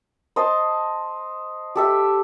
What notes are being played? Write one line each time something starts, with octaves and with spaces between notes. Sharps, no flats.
C5 D#5 A5
G4 A4 E5